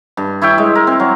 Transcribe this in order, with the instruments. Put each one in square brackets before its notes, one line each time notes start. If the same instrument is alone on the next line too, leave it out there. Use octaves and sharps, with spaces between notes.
[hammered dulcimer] G2
E4 C#5 E5 G5
G#3
A#4
C4
F#3